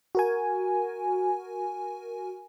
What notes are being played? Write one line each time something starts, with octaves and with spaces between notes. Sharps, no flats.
F#4 A#4 G#5